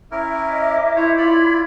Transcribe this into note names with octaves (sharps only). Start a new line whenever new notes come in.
C#4 E4 A#4 E5 D6
D#5
E4 C5 C#5
F4 D5 B5